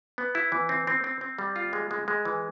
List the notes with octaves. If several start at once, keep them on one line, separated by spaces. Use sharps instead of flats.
B3
E4
E3
C4
C4
C4
C4
G3
F4
G#3
G#3
G#3
E3